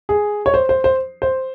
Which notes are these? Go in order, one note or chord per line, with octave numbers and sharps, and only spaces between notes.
G#4
C#5
C5
C5
C5
C5